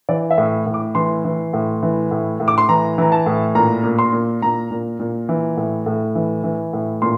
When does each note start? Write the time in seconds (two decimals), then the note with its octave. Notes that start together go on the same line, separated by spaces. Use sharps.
0.09 E3 D5
0.31 E5
0.38 A2
0.66 A2
0.74 D6
0.95 E3 C6
1.25 E3
1.53 A2
1.83 E3
2.11 A2
2.40 A2
2.48 D6
2.58 C6
2.69 E3 A#5
2.98 E3 A#5
3.12 A5
3.26 A2
3.55 A#2 A#5
3.84 A#2
3.99 C6
4.13 A#2
4.42 A#2 A#5
4.71 A#2
5.00 A#2
5.29 E3
5.57 A2
5.86 A2
6.15 E3
6.44 E3
6.73 A2
7.02 A#2 C6